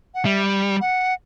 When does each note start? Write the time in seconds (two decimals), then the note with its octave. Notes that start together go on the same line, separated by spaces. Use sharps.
0.15 F#5
0.25 G3 E5
0.81 F#5